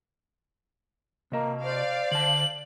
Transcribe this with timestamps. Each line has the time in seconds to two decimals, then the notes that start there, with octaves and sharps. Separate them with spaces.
1.32 C3 A#3 D#5
1.64 C5 D5 F5
2.11 D3 A5 F#7